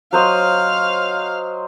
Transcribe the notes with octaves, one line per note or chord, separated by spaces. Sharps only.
F#3 C5 D#5 F5